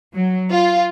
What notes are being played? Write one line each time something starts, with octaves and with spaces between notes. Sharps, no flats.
F#3
F4